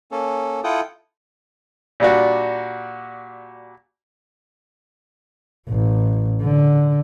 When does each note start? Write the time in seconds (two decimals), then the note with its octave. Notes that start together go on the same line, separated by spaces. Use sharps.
0.12 A#3 C#4 A4
0.64 E4 F4 A4 F#5 G5 D#6
2.00 A#2 G3 D4 F#4
5.69 A1
6.42 D3